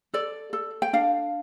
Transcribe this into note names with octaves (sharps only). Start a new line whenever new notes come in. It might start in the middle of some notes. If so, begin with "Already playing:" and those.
A4 D5
A4
G5
D4 F5